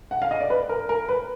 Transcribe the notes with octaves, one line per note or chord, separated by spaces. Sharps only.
F#5
F5
D#5
D5
B4
A#4
A#4
B4